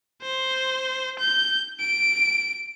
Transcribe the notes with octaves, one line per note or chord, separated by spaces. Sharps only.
C5
G6
D7